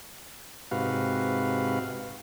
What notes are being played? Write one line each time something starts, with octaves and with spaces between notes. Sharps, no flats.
G#2 C3 F#4 B4 F5